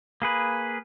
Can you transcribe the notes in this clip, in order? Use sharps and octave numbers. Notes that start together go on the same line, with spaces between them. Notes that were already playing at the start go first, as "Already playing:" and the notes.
A#3 G#4 B4